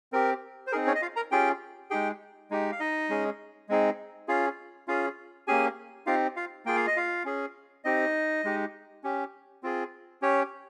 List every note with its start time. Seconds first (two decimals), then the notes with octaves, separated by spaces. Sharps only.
0.13 C4 G4 A#4
0.67 C5
0.72 C4 D#4 G#4 A#4
0.86 C#4 C#5
0.95 D#5
1.02 F4 F5
1.16 A#4 A#5
1.31 C#4 F4 G4 G#4 G5
1.90 G#3 D#4 G4 G#4 G5
2.50 G#3 D#4 G4
2.72 F5
2.80 D#4 D#5
3.09 G#3 C#4 G#4
3.69 G#3 C4 D#4 G#4
4.28 C#4 F4 G#4 F5
4.88 C#4 F4 G#4 F5
5.47 A#3 C#4 G4 G#4 G#5
6.06 C4 D#4 F4 G4 F5
6.36 F4 F5
6.65 A#3 F4 G#4 G5
6.76 F5
6.87 D#5
6.97 F4 F5
7.25 C#4 G#4
7.84 C4 D#4 G4 D#5
8.44 G#3 D#4 G4
9.04 C#4 G4
9.63 C4 F4 G#4
10.22 C#4 G4 C#5